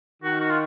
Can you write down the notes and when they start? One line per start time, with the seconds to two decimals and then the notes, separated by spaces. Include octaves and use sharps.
0.23 D#3 F#4
0.41 F#4
0.51 F4